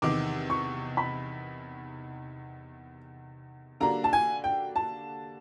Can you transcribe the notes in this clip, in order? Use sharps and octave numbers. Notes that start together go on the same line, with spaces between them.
E2 C3 D#3 D6
C#6
B5
D3 G3 A#3 D4 F#4 A#5
A5
G#5
G5
A5